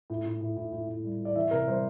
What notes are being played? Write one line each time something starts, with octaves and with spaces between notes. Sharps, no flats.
A2
A2
A2
A2
A2
A2
G3
A2
D5
E3 E5
C3 A#4
G3 C5